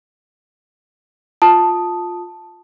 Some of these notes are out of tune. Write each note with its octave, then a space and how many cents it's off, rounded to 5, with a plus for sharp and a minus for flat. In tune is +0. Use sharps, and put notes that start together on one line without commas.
F4 +15 A5 +0 D#6 +0